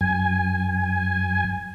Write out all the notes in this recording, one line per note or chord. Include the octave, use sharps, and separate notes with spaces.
F#2 G#5